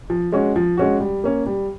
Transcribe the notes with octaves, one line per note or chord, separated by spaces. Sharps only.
F3
G#3 C#4 F#4
F3
G#3 C#4 F#4
G3
A#3 C#4
G3